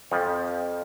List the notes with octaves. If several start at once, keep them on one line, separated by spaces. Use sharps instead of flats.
F2 F3